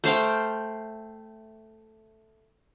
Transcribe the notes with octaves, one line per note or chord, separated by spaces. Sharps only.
A3 C5 F5 G5